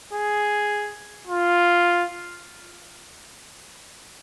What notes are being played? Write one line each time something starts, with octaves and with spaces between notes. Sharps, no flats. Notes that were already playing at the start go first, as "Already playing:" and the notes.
G#4
F4